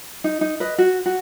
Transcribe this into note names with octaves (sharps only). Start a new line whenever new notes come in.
D#4
D#4
B4 D#5
F#4
F#4